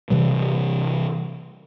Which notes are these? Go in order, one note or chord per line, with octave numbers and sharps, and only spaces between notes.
C3 E3 G3